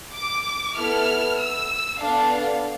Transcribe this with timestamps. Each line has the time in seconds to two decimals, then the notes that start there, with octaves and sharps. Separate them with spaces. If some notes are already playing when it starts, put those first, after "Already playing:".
0.14 D6
0.76 B3 E4 A4 F6
1.38 E6
2.00 B3 D4 A4 F5